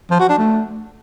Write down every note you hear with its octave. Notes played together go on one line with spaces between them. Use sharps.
F3
F#4
D4
A3